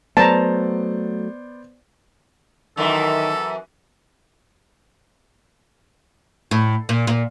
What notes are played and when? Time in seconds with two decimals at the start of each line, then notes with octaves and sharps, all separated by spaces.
0.17 F#3 A3 B3 C5 D5 A5 A#5
2.77 F#2 D#3 E3 A4
6.51 A2
6.89 A#2
7.07 A#2